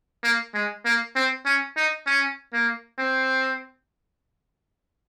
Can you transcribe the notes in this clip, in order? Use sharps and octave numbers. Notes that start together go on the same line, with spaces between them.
A#3
G#3
A#3
C4
C#4
D#4
C#4
A#3
C4